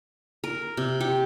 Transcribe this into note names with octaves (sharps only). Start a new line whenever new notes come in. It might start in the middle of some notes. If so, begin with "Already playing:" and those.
A#4
C3
G4